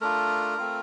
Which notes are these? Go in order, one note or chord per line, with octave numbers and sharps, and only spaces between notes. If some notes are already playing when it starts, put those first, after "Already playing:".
A3 D4 F4 A#4
A3 C4 F4